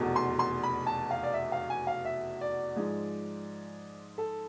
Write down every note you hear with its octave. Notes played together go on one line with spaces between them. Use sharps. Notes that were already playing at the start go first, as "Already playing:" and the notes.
Already playing: F1 E2 B2
C6
C6
B5
A5
F5
D5
E5
F5
G#5
F5
E5
D5
G#2 F3 G#3
A4